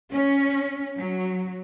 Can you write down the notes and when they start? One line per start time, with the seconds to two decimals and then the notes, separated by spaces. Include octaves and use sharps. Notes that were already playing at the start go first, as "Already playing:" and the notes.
0.11 C#4
0.97 F#3